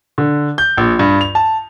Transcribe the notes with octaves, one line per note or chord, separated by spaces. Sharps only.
D3
G6
A#1
G2
F7
A5